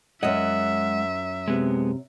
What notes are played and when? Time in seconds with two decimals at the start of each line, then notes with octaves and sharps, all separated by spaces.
0.23 F#2 G#3 D#5 E5 F#5
1.48 C3 G#3 B3